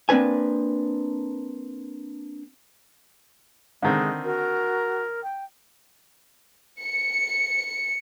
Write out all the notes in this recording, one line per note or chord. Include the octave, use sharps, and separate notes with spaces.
A#3 C4 D4 B4 G#5
D3 D#3 G#3 C4
F#4 A#4
G5
C#7